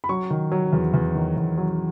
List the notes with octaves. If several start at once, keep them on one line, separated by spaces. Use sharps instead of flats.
B5
F#3 C#6
D#3
F#3
E2
E2
D#3
E2
F#3